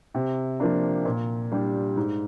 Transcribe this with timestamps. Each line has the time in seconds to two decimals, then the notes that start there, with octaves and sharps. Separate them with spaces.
0.14 C3
0.60 F3 A#3 D4
1.05 A#2
1.51 G3 D4 G4
1.97 G#2